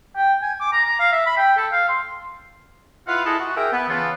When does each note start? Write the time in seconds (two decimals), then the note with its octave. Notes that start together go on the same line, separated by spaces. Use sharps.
0.16 G5
0.42 G#5
0.60 D6
0.73 A#5
0.85 A#5
1.00 F5
1.12 E5
1.26 B5
1.38 G5
1.57 A4
1.72 F5
1.89 C6
3.07 E4 F4 B4 F5 F#5
3.25 A3 E4 G#4 A4 D#5
3.40 F#4
3.57 G#4 A#4 E5 G5
3.73 B3
3.88 C#3 E3 B3 F4 A4